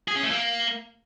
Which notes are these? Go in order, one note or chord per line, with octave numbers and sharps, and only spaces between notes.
G#4
C#4
A3
A#3